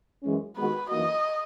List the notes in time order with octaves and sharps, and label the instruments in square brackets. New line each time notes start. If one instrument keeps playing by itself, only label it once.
[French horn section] F#2 E3 G#3 C#4
[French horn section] D#3 G#3 B3 F#4 [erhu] B4
[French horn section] F#2 E3 A#3 D#4 F#4 [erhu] D#5